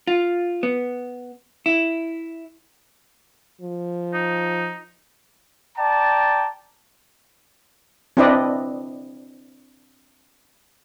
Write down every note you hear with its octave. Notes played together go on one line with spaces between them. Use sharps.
F4
B3
E4
F3
D#4
D5 G5 A5 A#5
C4 D4 E4 B4 D5 D#5